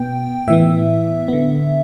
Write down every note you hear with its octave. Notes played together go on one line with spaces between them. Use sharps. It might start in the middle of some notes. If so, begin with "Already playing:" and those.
Already playing: B2 B3 G5
A2 E3 B3 E5
D3 B3